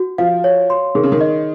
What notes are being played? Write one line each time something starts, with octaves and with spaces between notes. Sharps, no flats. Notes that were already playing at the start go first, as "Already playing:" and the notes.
Already playing: F#4
F3 F5
C#5
C6
D#3 G#4
C#3
D#3
D#5